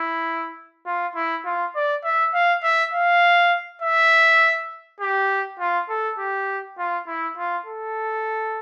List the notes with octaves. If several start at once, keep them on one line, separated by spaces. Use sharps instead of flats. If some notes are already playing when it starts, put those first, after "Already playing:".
Already playing: E4
F4
E4
F4
D5
E5
F5
E5
F5
E5
G4
F4
A4
G4
F4
E4
F4
A4